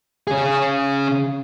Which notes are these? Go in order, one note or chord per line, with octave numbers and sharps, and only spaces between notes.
C#3 G#4